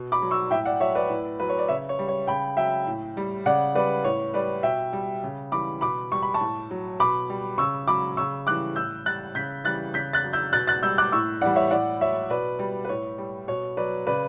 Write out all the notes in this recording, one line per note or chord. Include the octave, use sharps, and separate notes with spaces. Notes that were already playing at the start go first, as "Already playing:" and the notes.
Already playing: B2
B5 D6
F#3
C#6 E6
A2 E5 G5
D5 F#5
F#3 C#5 E5
B4 D5
A2
F#3 B4
C#5
D5
C#3 C#5 E5
C#5
G3
C#5
C#3 G5 B5
F#3 E5 G5
A2
G3
C#3 D5 F#5
G3 B4 D5
A2 C#5
G3 B4 D5
B2 E5 G5
G3
C#3
E3 G3 B5 D6
B2 B5 D6
G3 C#6
B5
A5 C#6
A2
F#3
B2 B5 D6
G3
C#3 C#6 E6
F#3 B5 D6
C#3 C#6 E6
E3 G3 D6 F#6
A2 E6 G6
G3 F#6 A6
C#3 G6 B6
E3 G3 F#6 A6
C#3 G6 B6
F#6 A6
F#3
E6 G6
B2 F#6 A6
F#6 A6
G3 E6 G6
D6 F#6
A2 C#6 E6
E3 G3 D5 F#5
C#5 E5
A2 D5 F#5
F#3 C#5 E5
B2 B4 D5
G3
B4
A2 C#5
G3
B2 C#5
F#3 B4 D5
C#3 B4 D5